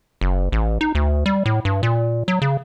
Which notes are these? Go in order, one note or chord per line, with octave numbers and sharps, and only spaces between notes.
F#1
A1
D#4
D2
G3
A2
G2
A#2
F#3
C#3